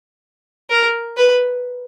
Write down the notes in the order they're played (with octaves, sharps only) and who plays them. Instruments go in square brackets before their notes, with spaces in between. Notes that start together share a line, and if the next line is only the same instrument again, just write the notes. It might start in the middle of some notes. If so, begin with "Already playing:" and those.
[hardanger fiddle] A#4
B4